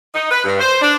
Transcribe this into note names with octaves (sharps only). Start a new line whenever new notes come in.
D#4
B4
G2
C5
D4